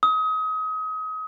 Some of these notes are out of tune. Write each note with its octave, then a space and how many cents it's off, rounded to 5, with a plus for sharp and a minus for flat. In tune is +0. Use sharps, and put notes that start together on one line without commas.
D#6 +30